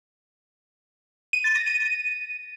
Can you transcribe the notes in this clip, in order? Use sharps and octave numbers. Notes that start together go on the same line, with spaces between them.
D#7
A6
A#6
D#7